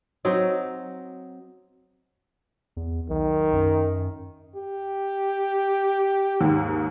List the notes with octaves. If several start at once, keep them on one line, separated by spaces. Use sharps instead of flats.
F#3 C4 D#4
E2
B1 D#3
F#2
G4
D#2 G#2